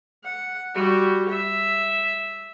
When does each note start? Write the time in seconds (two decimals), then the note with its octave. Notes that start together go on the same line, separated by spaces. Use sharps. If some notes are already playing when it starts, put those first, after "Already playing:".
0.25 F#5
0.75 G3 F#4
1.30 E5